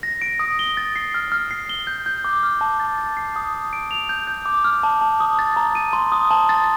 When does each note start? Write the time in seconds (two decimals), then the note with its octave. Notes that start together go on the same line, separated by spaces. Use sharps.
0.03 A#6
0.22 D7
0.40 D#6
0.59 G7
0.77 A6
0.96 C7
1.14 F6
1.32 F6
1.51 C7
1.69 G7
1.87 G6
2.06 G6
2.25 D6
2.43 F6
2.61 A5
2.80 A6
2.98 A6
3.17 C7
3.36 D#6
3.54 D#6
3.73 D7
3.91 F7
4.09 G6
4.27 G6
4.46 D6
4.64 F6
4.83 A5
5.01 A5
5.20 D#6
5.39 A6
5.56 A#5
5.75 D#7
5.93 C6
6.12 D#6
6.31 A5
6.49 A6